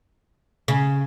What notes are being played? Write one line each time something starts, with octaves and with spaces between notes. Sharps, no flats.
C#3